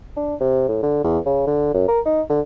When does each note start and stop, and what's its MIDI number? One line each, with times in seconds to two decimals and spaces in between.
0.17 0.35 62
0.40 0.68 48
0.68 0.80 45
0.83 1.02 50
1.04 1.19 40
1.26 1.47 49
1.47 1.72 50
1.74 1.85 42
1.88 2.00 70
2.06 2.22 63
2.30 2.41 50